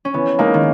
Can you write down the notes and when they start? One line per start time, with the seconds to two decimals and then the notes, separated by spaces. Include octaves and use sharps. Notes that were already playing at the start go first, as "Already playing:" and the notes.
0.05 C#4
0.14 E3 B3
0.39 G#3 A#3 D#4 A#4
0.54 D#3